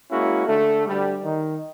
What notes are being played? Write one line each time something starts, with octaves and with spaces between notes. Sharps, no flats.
G#3 A#3 C#4 E4 F#4
D3 A3
D2 G3
D#3